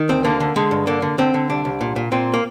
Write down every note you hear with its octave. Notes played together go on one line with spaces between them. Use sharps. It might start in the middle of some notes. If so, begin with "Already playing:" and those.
Already playing: D#3
D2 C4
D3 A#3
D3
D3 G#3
G2
D3 A#3
D3
D3 C4
D3
C2 D4
C2
A#2
A#2
A#2 C4
A#3